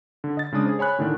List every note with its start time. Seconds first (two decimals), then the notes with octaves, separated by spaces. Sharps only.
0.24 D3
0.37 D#5 A6
0.52 C#3 G#3 D4 D#6
0.65 G#4 C5
0.79 C#5 G#5 B5 F#6
0.98 A2 D3 D#3 A3 D4